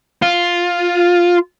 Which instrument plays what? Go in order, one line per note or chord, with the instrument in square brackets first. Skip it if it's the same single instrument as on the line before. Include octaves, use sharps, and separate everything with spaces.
[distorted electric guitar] F4